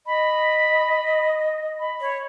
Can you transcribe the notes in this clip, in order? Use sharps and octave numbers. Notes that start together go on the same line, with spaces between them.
D#5 B5
B5
C#5